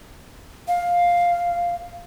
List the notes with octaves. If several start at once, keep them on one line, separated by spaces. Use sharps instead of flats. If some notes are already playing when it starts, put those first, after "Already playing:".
F5